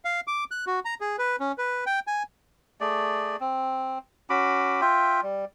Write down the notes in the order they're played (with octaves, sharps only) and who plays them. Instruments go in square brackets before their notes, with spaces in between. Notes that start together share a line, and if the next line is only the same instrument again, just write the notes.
[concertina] F5
D6
F#6
F#4
A#5
G#4
B4
C#4
B4
G5
G#5
[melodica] A3 G#4 D5
C4
C#4 F#4 B5 D6
F4 E5 G5
G3